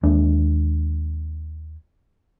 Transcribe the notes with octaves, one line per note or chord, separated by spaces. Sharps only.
D#2 G#3 D4